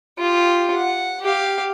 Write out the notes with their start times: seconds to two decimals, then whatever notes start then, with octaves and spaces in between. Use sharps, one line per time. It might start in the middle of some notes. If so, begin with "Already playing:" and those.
0.18 F4 G4
0.75 F#5
1.22 G4 F5